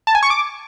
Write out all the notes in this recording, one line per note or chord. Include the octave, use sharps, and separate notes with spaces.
A5
G#5
C#6
D6